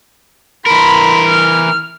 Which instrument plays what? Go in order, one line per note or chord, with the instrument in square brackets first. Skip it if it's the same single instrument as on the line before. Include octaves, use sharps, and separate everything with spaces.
[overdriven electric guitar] E3 A#4 [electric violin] B5 C6
[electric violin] F6